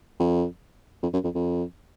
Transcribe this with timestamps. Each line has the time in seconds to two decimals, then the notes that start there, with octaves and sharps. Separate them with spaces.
0.19 F2
1.02 F2
1.13 F#2
1.24 F2
1.35 F2